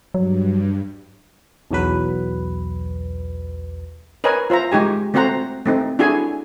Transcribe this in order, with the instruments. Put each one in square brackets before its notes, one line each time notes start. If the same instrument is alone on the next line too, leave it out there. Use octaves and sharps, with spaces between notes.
[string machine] G2 [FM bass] F#3
[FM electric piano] B1 E2 F#3 B4
[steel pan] A#4 B4 C#5 D#5 G#5
F4 C5 E5 A#5
G#3 D#4 G4 G#5
A3 C4 F#4 C5 F#5 A#5
A3 C4 D#4
D4 E4 F#4 G#4 A4 G#5